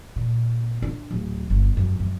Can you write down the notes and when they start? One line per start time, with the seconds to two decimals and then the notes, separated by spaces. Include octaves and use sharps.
0.16 A#2
0.82 D4
1.11 D1
1.50 G1
1.77 F#2
2.00 F#2